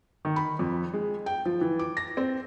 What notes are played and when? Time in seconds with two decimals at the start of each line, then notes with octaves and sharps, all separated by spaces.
0.25 D#3
0.36 B5
0.59 F2
0.94 G#3
1.26 G5
1.46 F3
1.61 E3
1.79 D6
1.97 A#6
2.17 C4